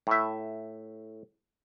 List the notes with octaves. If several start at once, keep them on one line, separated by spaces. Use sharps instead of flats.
A2 E5